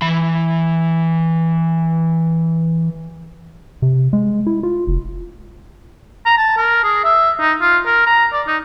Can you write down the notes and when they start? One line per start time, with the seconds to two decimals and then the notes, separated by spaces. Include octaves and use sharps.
0.02 E3 B5
3.82 C3
4.13 G#3
4.47 E4
4.63 F4
4.87 F1
6.26 A#5
6.38 A5
6.57 A#4
6.84 G#4
7.04 E5
7.39 D#4
7.61 F4
7.86 A#4
8.06 A#5
8.33 D5
8.47 D#4